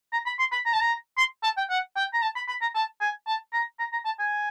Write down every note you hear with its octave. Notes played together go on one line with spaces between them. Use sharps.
A#5
B5
C6
B5
A#5
A5
A#5
C6
A5
G5
F#5
G5
A#5
A5
B5
B5
A#5
A5
G#5
A5
A#5
A#5
A#5
A5
G#5